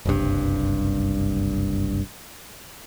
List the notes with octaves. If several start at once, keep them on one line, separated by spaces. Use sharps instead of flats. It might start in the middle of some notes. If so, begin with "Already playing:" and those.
F#1 C2 G2